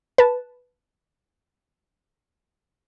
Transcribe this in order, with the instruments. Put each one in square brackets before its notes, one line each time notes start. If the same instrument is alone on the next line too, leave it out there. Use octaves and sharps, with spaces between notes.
[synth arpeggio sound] B4 A5